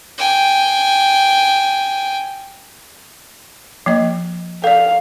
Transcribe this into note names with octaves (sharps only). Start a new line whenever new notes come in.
G5 G#5
F3 A#3 D#5
A4 D5 F5